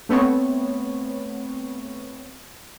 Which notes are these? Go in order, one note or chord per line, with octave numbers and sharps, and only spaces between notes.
A3 B3 C4 C#5